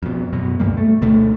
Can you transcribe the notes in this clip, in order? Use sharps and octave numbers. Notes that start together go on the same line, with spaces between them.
F2 B2
F#2 B2 F#3
D2 G2 G3 A#3
A3
D2 B2 A3